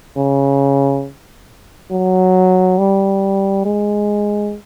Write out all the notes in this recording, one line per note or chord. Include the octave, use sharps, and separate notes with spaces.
C#3
F#3
G3
G#3